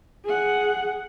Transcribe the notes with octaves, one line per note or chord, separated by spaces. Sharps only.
G#4 F#5